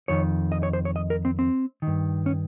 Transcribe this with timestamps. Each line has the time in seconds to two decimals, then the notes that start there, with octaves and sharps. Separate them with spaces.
0.08 F2 D#3 C#5
0.52 D#5
0.63 C#5
0.73 C5
0.85 C#5
0.96 D#5
1.10 A#4
1.25 C4
1.39 C4
1.82 G2 D#3
2.26 C#4